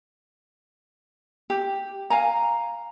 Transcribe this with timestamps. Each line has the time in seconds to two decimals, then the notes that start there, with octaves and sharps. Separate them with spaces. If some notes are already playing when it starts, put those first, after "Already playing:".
1.50 G4
2.10 F5 G#5 A#5